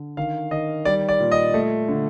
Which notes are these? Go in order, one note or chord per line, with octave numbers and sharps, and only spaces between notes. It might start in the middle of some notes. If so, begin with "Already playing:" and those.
Already playing: D3
D#3 F5
D#3 D#5
G3 D5
D5
A#2
D#5
A3
D3